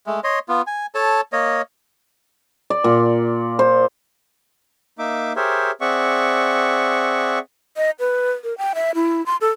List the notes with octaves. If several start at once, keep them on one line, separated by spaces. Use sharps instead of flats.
G#3 A3
C#5 D#5 C6
B3 F4
G#5
A4 C#5 A5
A#3 C#5 D#5
D5
A#2
C5
A#3 D#4 E5 D6
G4 G#4 A#4 C5 C#5 E5
C4 G#4 D5 E5 F#5 C#6
D#5
B4
A#4
G5
E5
E4
C6
A4